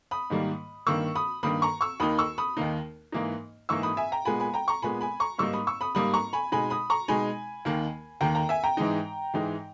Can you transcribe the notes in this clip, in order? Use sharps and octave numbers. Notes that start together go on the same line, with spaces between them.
B5 D#6
G#2 D#3 G3 A#3
G2 D#3 A#3 C#6 E6
B5 D#6
G2 D#3 A#3 B5 D#6
A#5 C#6
C#6 E6
D#2 D#3 A#3 D#4 B5 D#6
C#6 E6
B5 D#6
D#2 D#3 A#3 D#4
G#2 E3 A#3 D#4
G#2 E3 A#3 D#4 C#6 E6
B5 D#6
E5 G#5
G5 A#5
A#2 G#3 B3 G#5 B5
G#5 B5
G5 A#5
A#5 C#6
A#2 G#3 B3 G#5 B5
G#5 B5
A#5 C#6
G#2 G3 A#3 D#4 C#6 E6
B5 D#6
C#6 E6
B5 D#6
G#2 G3 A#3 D#4 B5 D#6
A#5 C#6
G#5 B5
B2 G#3 D#4 G#5 B5
B5 D#6
A#5 C#6
B2 G#3 D#4 G#5 B5
D#2 D#3 A#3
D#2 D#3 A#3 G5 A#5
G5 A#5
E5 G#5
G5 A#5
G#2 E3 G#3 D#4
G#2 E3 G#3 D#4